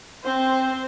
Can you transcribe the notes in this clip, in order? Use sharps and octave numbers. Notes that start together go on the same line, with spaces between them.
C4 C5